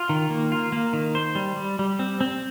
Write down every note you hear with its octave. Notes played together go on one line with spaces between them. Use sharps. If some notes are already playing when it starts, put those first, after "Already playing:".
Already playing: F4
D#3
A#3
F4
A#3
D#3
C5
G3
G3
G3
C4
C4